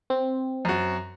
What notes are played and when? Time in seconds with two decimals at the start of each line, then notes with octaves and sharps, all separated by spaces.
0.10 C4
0.65 F#2 F#4